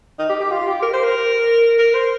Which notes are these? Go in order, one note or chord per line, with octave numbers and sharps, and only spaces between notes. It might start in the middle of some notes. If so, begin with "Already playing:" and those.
D#4
G4
G4
F4
G4
A#4
C5
A#4
A#4
C5